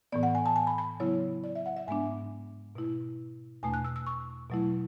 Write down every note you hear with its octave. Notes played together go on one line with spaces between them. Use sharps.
A2 E3 B3 D5
F#5
G#5
A5
G#5
B5
B5
C#3 F#3 B3 E4 C#5
D5
E5
F#5
E5
G#2 G#3 B3 D4 G#5
B2 A3 E4
E2 B2 A3 D4 G#5
F#6
E6
E6
C#6
B2 F#3 A3 E4